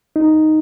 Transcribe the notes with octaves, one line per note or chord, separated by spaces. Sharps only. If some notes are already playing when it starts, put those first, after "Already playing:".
D#4